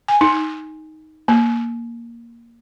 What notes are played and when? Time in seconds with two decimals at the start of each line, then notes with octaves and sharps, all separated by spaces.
0.08 G#5
0.21 D#4
1.28 A#3